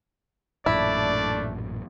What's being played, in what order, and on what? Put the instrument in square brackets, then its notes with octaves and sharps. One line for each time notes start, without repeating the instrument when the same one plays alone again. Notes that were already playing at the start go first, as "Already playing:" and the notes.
[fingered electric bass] A1 F#2 A#2 [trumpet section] A3 D4 D5 [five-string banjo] E4